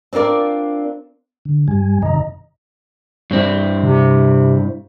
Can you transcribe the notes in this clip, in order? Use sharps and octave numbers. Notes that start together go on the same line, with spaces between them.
C4 D4 F4 A#4 D5
D3
G2 G3 G#5
F#2 C3 D#3 D#5 A#5
G2 C4 E4
C3